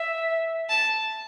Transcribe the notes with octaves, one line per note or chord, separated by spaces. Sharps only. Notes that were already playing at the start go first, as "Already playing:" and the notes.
Already playing: E5
A5